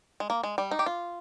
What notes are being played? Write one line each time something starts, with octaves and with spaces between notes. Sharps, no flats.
G#3
A#3
G#3
G3
D#4
G4
F4